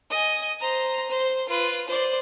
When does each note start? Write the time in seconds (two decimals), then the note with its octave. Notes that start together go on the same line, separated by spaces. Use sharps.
0.10 D#5 G#5
0.60 C5 A#5
1.10 C5
1.49 F4 B4
1.88 C5 D5